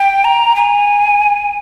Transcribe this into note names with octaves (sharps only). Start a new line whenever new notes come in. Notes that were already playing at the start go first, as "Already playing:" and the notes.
Already playing: G5
A#5
G#5